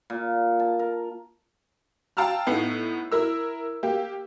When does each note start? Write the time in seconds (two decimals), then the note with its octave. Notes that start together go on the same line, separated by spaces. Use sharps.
0.10 A#2
0.60 A5
0.79 A#4
2.17 F5 G5 A5 A#5 E6 F6
2.47 A2 B3 D#4 C7
3.11 E4 A#4 E6
3.83 A#3 G4